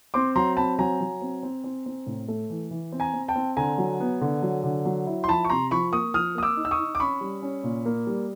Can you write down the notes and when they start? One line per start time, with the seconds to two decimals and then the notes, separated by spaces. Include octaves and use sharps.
0.14 C4 C6 D6
0.36 F#3 A#5 C6
0.57 C4 A5 B5
0.79 F#3 G#5 A#5
1.01 F#3
1.22 C4
1.43 C4
1.64 C4
1.86 C4
2.07 A2
2.28 A3
2.50 E3
2.71 E3
2.92 C4
3.00 G#5 A#5
3.14 C4
3.28 G5 A5
3.36 C4
3.57 D3 G#5 A#5
3.78 F#3
4.00 B3
4.21 D3
4.42 F#3
4.64 D3
4.85 F#3
5.07 E4
5.24 C6
5.28 F3 A5 B5
5.45 C#6
5.50 C3 A#5 C6
5.71 F3 B5 C#6
5.92 A#3 C#6 D#6
6.14 F3 D#6 F6
6.35 A#3 D#6
6.43 D6 E6
6.57 D#4
6.65 E6
6.71 C#6 D#6
6.79 D#4
6.95 D6
7.00 C#4 B5 C#6
7.21 G3
7.42 C#4
7.64 A#2
7.86 A#3
8.07 G3